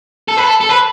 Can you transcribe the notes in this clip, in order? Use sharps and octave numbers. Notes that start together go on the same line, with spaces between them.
A4
B4
A4
A4
B4